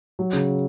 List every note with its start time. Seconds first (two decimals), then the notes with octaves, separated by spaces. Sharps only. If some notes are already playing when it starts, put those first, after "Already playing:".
0.19 F#3
0.33 C#3